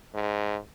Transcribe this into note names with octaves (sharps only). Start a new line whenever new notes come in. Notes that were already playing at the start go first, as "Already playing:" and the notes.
G#2